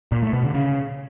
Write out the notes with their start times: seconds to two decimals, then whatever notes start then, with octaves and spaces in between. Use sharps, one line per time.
0.12 A#2
0.22 A3
0.33 B2
0.44 D3
0.54 C#3